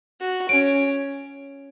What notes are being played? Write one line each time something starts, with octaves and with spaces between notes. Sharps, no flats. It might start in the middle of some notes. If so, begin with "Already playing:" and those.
F#4
C#4 D7